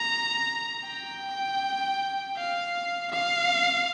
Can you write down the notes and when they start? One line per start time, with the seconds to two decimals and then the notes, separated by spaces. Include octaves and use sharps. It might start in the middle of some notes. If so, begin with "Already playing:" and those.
Already playing: A#5
0.87 G5
2.37 F5
3.11 F5